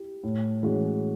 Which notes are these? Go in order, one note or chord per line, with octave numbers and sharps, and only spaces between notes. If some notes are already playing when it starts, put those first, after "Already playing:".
Already playing: E4 G4
A2
E3 G#3 C#4 F#4